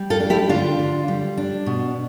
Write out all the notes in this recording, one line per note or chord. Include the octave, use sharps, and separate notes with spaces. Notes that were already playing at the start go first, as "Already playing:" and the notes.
Already playing: G3
F4 A4
D4
E4 G4
D3 D4 F4
D3
G3
D4
B2